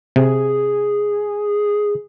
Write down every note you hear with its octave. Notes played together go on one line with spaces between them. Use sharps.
C3 G#4